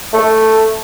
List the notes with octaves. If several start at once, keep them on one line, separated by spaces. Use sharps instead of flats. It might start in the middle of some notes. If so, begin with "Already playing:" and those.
A3